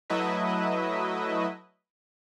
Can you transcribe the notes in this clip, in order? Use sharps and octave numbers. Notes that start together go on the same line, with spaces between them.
F#3 A3 E4 B4 D#5 E5